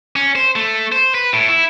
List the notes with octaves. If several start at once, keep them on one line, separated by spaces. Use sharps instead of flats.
C#4
C5
A3
C5
B4
A2
E4